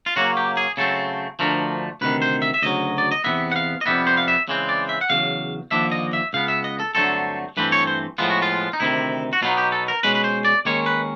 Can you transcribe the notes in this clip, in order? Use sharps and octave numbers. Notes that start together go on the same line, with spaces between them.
F4
C#3 F#3 A#3 C#4 F#4
G4
G#4
C#3 F#3 A3 C4 A4
D2 D3 F3 A3 A#4
D2 C3 D#3 B4
C5
E5
E5
D2 C#3 F#3 D#5
D5
D#5
E2 C3 D#3 G#3 B3 E5
F#5
F5
D#5
F2 C3 D#3 G3 B3 E5
C5
F5
E5
C#3 E3 G#3 C4
D5
E5
F#5
E2 C#3 F#3 F5
D#2 D3 F3 D4 E5
D#5
E5
C#2 C#3 B3 F5
E5
D#5
A4
G2 D3 F#3 A3 C4 A4
G2 E3 A3 C4 B4
C#5
C5
A2 F3 G#3 B3 F4
F#4
F4
D#4
D2 C3 D#3 E4
F#4
B2 F#3 B3 D#4 F4
G4
A4
A#4
B2 G#3 C#4 B4
B4
C5
D5
D#2 D#3 G#3 C#4 C#5
B4